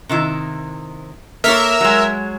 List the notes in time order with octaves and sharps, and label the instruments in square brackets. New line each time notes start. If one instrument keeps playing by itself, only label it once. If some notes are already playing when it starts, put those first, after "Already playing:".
[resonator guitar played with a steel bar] C3 D#3 E4
[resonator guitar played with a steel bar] A#3 A4 C#5 [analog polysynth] A#4 E5
[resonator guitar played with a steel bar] F#3 G#3